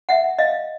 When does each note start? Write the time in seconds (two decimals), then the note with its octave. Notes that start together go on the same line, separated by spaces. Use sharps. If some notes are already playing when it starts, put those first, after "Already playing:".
0.09 E5 F#5
0.38 D#5 F5